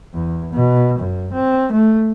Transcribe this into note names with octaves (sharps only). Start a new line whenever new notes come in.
E2
B2
F#2
C4
A3